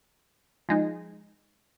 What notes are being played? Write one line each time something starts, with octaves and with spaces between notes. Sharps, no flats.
F3 G#3 D#4